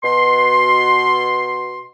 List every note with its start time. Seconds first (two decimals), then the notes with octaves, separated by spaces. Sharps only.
0.03 B2 C6